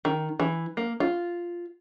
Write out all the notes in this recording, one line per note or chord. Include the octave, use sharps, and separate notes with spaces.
D#3
E3
A#3
F4